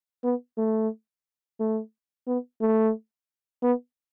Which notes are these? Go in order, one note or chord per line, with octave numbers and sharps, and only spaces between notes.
B3
A3
A3
B3
A3
B3